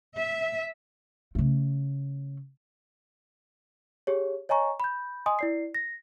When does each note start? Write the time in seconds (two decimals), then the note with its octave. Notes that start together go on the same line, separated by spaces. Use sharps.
0.15 E5
1.35 C#3 A3
4.07 G4 G#4 C#5
4.49 C#5 D#5 G#5 A#5 C#6
4.80 B5 G6
5.26 D#5 G#5 C6 D#6
5.39 E4 D5 C7
5.75 A#6